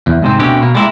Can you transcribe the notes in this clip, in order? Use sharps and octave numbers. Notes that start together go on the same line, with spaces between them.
E2
G#2 C3 C4
D2 B2 D3 C4 C#4 G4
B2 A#3
G3 G#3 A#3 E4 A#4